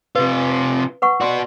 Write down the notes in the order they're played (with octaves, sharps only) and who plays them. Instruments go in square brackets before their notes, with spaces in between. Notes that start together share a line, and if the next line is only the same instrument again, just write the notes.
[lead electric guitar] C3 F4 [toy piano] B4
[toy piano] B4 F#5 C#6
[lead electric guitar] B3 F#4 [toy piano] D5 C6